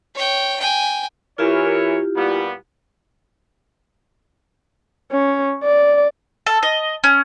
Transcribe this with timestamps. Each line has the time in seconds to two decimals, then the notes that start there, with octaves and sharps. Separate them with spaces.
0.15 C#5 G5
0.60 G5 G#5
1.38 E3 E4 F4 G4 A#4 C#5
2.16 A#2 G3 B3
5.11 C#4
5.63 D5
6.47 A4
6.63 D#5
7.04 C#4